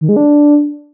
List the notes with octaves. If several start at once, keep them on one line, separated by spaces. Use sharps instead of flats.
D#3
G#3
D4